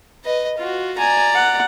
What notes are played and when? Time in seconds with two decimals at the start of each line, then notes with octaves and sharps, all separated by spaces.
0.24 B4 D#5
0.58 F4 F#4
0.98 D5 G#5 A#5
1.34 F#5